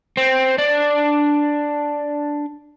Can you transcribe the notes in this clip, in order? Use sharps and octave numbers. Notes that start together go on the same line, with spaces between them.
C4
D4